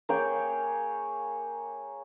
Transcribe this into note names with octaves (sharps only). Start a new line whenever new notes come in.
A#3 G#4 C#5 G5